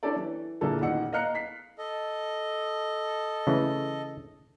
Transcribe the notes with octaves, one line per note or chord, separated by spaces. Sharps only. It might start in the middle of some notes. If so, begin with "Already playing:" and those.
C#4 D4 E4 G4 A4 D5
E3
A#2 D3 A#3 E4 G#4 A4
A1 A#2 D#3 F#5 E6 C#7
D#5 F5 A#5 F6 F#6 C#7
B6 C7
A4 D#5
C#3 E3 A3